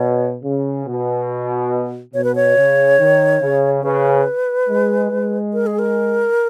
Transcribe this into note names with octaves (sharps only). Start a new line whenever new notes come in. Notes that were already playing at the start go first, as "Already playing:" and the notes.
Already playing: B2 C#5
C#3
B2
B2 C#5
B4
C#5
C#3
D#3
C#3
C#3 B4
G#3
G#3
A#4
G#4
A#4